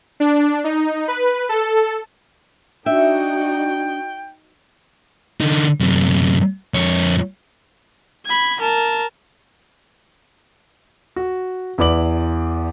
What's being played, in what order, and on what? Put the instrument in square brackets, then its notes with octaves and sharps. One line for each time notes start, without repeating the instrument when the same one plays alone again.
[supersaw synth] D4
D#4
B4
A4
[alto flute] D4 [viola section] D#4 F#4 [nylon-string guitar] E5 [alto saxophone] G5
[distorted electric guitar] D3 D#4
F#2 C3
F2 C#5
[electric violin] B5 G#6
A#4 A5
[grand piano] F#4
E2 E4 B4 D5 D6 F#7